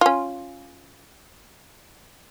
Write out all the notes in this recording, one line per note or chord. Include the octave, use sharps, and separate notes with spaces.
C#4 F4